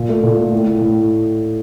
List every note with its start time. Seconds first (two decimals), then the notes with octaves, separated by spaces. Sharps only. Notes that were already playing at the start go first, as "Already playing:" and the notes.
Already playing: A#2
0.09 A3
0.23 A#2
0.38 A3
0.52 A2
0.67 A2
0.82 A2